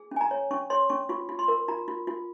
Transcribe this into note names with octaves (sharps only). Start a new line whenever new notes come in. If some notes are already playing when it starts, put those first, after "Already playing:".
Already playing: G#4
C#4 G#5
A#5
C#5
C#4 C#6
C#5 C6
C#4 C#6
F4 C#6
F4
C6
A#4
F4 A#5
F4
F4